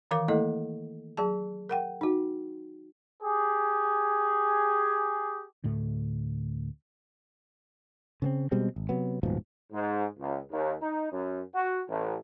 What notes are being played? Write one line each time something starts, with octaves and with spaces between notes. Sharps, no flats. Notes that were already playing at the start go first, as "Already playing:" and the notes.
D#3 E3 A#4 F5 D6
A3 A#3 E4 A4 D#5
F#3 G#4 A5
A#4 F#5 G5
D#4 F#4
G4 G#4
D2 A2 A3
C#3 B3 C4
B2 G3 G#3 C4
G#1
C3 F#3 B3
D#1 G#2 B2 F3
G#2
C#2
D#2
D#4
F#2
F#4
A1